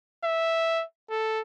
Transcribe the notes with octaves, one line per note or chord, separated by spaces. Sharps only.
E5
A4